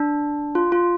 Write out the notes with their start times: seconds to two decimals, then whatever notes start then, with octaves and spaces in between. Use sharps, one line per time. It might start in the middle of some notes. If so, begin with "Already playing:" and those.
Already playing: D4
0.55 F4
0.72 F4